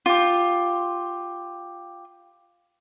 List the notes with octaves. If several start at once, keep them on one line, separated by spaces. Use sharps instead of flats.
F4 G4